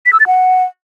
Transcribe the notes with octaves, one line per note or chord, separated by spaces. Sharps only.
B6
E6
A6
F#5